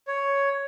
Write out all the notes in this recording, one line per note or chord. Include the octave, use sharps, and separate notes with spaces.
C#5